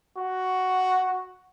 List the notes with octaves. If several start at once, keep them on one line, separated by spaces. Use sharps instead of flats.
F#4